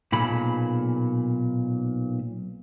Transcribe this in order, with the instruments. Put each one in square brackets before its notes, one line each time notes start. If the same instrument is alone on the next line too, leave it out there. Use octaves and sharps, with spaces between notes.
[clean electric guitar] B1 A#2 A#3 G#4 A4 B5